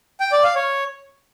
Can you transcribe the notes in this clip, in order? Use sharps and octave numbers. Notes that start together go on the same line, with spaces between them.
G5
D5
F5
C#5